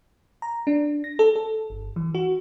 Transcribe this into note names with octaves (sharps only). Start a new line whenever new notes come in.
A#5
D4
A#6
A4
A4
G1
E3
F#4